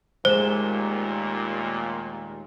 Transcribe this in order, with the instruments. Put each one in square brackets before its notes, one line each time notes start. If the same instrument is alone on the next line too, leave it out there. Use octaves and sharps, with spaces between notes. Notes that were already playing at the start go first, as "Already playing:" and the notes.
[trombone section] D#2 A#2 [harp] G#3 A3 E7 [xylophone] C5